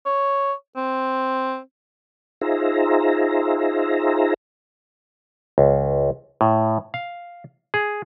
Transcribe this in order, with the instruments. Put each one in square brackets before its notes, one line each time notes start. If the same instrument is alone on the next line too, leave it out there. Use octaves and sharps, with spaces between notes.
[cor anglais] C#5
C4
[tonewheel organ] D#4 F4 G#4 C5 E5 A#5
[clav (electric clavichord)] C#2
A2
F5
G#4